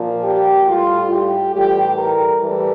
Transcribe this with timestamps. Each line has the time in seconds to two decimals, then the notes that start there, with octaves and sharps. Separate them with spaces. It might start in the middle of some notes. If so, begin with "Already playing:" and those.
Already playing: A#2 F3
0.23 G4
0.67 A2 G3 F4
1.11 G4
1.54 A2 E3 G3 G4
1.98 A#4
2.42 A2 E3 G3 A4